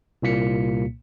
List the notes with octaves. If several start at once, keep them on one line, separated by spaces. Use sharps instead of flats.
C2 A#2 A#3 B6 C#7